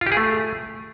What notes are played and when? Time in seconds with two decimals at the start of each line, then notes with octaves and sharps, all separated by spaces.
0.01 F4
0.07 G4
0.12 G#4
0.17 A3